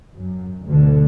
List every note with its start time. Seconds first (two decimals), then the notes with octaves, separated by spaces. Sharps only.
0.14 F#2
0.66 D2 B2 D3